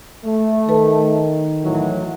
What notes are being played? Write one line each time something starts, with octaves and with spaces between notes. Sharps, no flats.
A3
D#3 A4 B4 A5
A2 E3 F#3